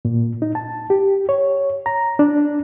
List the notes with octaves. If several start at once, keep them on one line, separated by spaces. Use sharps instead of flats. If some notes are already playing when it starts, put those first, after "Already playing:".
A#2
D#4
A5
G4
C#5
A#5
D4